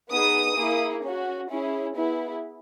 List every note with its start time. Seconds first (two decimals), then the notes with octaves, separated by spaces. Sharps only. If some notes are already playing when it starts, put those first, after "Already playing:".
0.10 B3 D#4 G#4 D#6
0.56 A#3 E4 G#4
1.04 C#4 F#4
1.50 C#4 E4 G#4
1.96 B3 E4 G#4